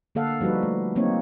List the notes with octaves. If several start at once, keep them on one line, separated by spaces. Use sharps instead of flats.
D3 A#3 A4 F5 F#5
F3 G3 D#4 F#4 B4
A3
F#3 A#3 C4 D#4 C#5